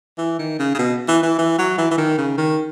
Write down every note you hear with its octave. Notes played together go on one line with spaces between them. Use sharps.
E3
D#3
C#3
C#3
B2
E3
E3
E3
F#3
E3
E3
D#3
C#3
D#3